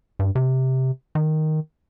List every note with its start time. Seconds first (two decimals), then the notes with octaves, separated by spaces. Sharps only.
0.19 G2
0.35 C3
1.15 D#3